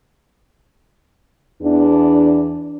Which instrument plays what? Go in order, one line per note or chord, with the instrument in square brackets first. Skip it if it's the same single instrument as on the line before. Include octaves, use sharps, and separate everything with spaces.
[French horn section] E2 D4